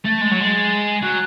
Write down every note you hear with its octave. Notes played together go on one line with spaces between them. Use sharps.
A3 A6
G#3
F#3
G#3
F#3 F#6